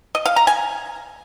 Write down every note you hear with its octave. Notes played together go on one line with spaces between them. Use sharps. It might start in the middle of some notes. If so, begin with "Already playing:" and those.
D#5
F5
A#5
G#5